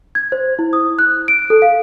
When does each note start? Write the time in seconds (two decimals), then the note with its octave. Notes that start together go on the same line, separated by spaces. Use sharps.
0.15 G#6
0.32 C5
0.59 E4
0.73 D#6
0.99 F#6
1.28 D7
1.50 A4
1.62 F5